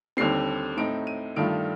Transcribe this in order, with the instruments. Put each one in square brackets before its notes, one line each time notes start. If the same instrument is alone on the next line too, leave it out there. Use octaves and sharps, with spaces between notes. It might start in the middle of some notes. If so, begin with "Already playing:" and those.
[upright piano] D#2 D3 G3 C4 C7
A2 A3 C4 D#4 D7
D#7
G2 D#3 A3 D4 F4 D7